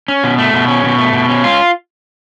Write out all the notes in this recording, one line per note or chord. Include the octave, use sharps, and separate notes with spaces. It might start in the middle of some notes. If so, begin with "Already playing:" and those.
C#4
B2
A3
B2
C#4
B2
A3
B2
C#4
F4